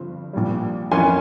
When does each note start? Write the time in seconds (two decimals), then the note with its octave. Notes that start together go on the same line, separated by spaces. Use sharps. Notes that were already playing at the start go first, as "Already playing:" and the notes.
Already playing: G1 G2 F3 C4
0.33 A#1 A#2 G3
0.91 F2 E3 A#3 C#4 G#5 C6